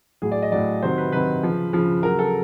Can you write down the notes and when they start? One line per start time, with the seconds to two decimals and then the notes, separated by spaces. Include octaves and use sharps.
0.22 A2 F#3 G#4
0.32 D5
0.42 D#5
0.52 A2 F#3 D5
0.82 C3 D#3 F#3 C5
0.98 B4
1.12 C3 D#3 F#3 B4
1.43 C#3 F3
1.73 C#3 F3
2.03 C#3 F#3 A#4
2.19 A4